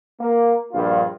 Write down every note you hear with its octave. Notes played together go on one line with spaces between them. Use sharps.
A#3
A#1 G2 F4